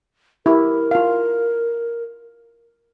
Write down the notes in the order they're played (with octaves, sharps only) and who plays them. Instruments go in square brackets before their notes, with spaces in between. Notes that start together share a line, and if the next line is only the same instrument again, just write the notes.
[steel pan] E4 G4 [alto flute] A#4
[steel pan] F4 F5